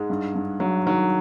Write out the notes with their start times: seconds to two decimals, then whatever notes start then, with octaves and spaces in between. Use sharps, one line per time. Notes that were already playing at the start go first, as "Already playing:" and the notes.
Already playing: G#2 G#3
0.10 G2
0.35 G2
0.60 G2 F#3
0.86 D#3 F#3